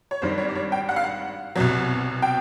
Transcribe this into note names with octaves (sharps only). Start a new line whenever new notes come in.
C#5
G#1 G2 D#3 G3 C5
C#5
D5
C#5
G5
F#5
F5
F#5
C2 B2 F#3
G5